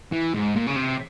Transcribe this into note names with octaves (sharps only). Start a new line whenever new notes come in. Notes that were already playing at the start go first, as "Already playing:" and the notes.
E3
G#2
A#2
C#3
C3